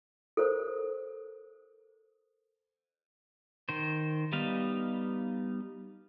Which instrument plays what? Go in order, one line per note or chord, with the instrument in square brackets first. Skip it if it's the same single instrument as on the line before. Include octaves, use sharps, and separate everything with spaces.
[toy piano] A4 A#4 C5 C#5
[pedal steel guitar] D#3 C5
G3 B3 D#4 F5